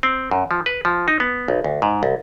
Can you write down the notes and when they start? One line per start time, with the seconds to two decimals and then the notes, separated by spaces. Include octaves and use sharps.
0.03 C4
0.31 F#2
0.51 F3
0.66 B4
0.85 F3
1.08 D#4
1.20 B3
1.48 B1
1.64 D2
1.82 G#2
2.03 C2